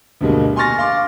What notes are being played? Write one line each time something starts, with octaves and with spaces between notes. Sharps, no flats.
D2 G2 B2 G#3 A#3
G#5 C6 C#6 F6 A6 A#6
F5 C6 D6